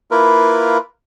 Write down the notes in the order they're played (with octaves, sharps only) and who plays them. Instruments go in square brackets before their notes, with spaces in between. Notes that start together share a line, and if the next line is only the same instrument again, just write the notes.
[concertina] A#3 E4 F4 A#4 B4